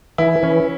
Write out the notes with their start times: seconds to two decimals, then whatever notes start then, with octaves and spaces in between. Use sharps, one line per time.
0.18 E3 E4
0.43 E3 C#4